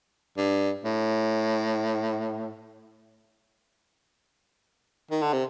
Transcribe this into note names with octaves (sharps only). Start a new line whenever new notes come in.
G2
A2
D#3
D3
C3